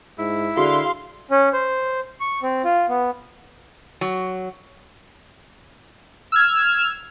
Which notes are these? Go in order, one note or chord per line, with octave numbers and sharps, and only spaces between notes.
G#2 E4
D3 F#4 G#4 F5 C6
C#4
C5
C#6
C4
F4
B3
F#3
E6 F6 G#6